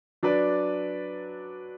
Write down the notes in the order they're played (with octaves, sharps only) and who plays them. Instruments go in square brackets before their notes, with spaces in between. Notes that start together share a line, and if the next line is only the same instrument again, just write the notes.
[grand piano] F#3 D4 B4 D5